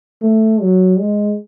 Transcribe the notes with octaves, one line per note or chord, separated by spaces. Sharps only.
A3
F#3
G#3